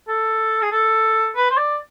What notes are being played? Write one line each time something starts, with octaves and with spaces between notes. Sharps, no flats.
A4
G#4
A4
B4
C5
D5